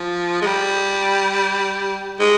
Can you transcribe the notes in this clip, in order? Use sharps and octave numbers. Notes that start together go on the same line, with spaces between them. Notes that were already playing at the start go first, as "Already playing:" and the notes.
Already playing: F3
G#3
G3
G#3